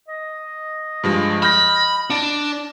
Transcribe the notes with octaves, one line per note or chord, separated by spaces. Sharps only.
D#5
G2 F3 G#3
B5 F6 G6 A#6
D4